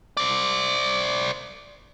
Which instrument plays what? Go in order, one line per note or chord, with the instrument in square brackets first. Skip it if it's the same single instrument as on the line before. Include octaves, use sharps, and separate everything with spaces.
[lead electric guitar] C5 D5